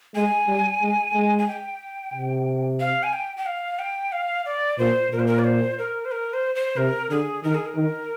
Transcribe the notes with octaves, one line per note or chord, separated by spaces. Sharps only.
G#3 G#5
G3
G#3
G#3
G#5
G5
C3
F5
G#5
G5
G5
F5
G5
F5
D5
A#2 C5
A#2 A#4
C5
A#4
D5
C5
A#4
C5
A#4
C5
C5
C3 A#4
D3 G#4
D#3 A#4
G#4
A#4
D#3